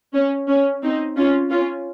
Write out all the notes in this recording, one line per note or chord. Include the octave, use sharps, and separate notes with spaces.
C#4
C#4
C4 D#4
C#4 F4
C#4 F4